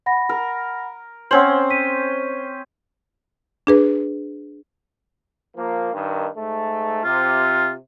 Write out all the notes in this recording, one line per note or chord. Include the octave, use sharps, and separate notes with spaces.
F#5 B5 A#6
A#4
C4 C#4 C5 F#5 G#6 F#7
B6 D#7
D4 G#4 B4
F3 A#3
G2 D#3
G#2 A3
C3 F4